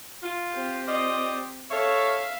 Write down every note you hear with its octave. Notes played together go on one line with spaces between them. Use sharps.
F4
C4 G4
F4 D5 D#5
A4 C#5 E5 F5